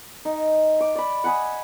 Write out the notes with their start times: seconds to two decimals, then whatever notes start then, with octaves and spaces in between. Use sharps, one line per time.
0.25 D#4
0.80 D6
0.95 D5 B5
1.24 F#5 G#5 B5 D#6